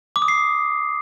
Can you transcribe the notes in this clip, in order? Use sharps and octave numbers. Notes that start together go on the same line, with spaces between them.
D6
D#6
C7